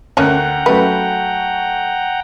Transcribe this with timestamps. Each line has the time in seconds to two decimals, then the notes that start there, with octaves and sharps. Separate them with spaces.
0.17 D2 A#3 C#4 F#5 G5 A#5 F#6
0.66 F#3 A3 C#4 B4